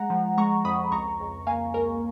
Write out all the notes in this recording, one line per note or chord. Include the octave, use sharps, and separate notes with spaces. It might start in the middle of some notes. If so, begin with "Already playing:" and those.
Already playing: G#3 F#5 A#5
F3
G#3 A#5 C#6
F2 B5 D#6
C#2 A#5 C#6
C#2
A#3 F5 G#5
C#2 A#4